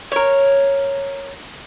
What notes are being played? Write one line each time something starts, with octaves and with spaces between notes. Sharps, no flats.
A#4 C#5